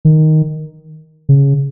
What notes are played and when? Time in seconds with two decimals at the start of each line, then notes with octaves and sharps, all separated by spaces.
0.05 D#3
1.29 C#3